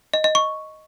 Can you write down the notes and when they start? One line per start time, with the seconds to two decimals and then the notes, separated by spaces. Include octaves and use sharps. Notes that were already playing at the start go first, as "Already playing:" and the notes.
0.14 D#5
0.24 D#5
0.35 C#6